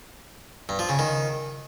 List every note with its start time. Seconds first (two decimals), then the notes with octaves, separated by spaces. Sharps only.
0.69 G2
0.79 F3
0.89 C#3
0.99 D#3